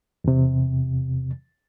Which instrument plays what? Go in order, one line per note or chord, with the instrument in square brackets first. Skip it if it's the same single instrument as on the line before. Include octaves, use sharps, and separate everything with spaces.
[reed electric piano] E2 C3